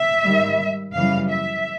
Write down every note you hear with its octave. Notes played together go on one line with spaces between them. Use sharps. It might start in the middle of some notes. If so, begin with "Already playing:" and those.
Already playing: E5
G#2 D#3 G3
F#2 C#3 E3 G3 F5
E5